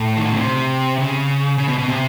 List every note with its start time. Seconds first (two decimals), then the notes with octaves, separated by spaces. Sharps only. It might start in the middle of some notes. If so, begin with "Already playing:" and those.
Already playing: A2
0.17 D#3
0.24 D3
0.31 C#3
0.39 C3
0.98 C#3
1.58 C#3
1.68 B2
1.78 B2
1.88 C3